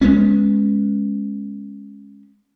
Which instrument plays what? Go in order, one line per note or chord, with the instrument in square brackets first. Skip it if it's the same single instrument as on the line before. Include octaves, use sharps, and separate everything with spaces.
[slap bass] G#3 B3 C#4